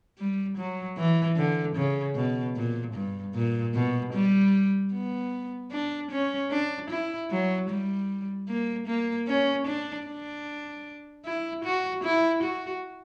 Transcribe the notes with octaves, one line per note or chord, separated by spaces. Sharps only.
G3
F#3
E3
D3
C#3
B2
A#2
G2
A#2
B2
G3
B3
D4
C#4
D4
E4
F#3
G3
A#3
A#3
C#4
D4
D4
E4
F#4
E4
F#4